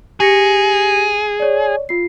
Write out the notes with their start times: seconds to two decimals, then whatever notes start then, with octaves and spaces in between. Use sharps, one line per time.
0.20 G4 G#4 A#6 C#7
1.40 C#5 D5
1.89 F4 C7